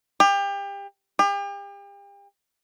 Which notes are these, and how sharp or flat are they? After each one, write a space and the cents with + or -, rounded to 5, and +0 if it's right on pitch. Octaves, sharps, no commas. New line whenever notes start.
G4 +30
G4 +40